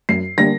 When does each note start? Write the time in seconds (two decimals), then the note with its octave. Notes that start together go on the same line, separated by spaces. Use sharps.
0.09 F#2 C7
0.38 D3 G3 A#3 A#6